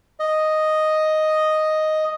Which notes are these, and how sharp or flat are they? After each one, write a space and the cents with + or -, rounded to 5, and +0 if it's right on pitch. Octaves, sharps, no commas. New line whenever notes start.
D#5 +0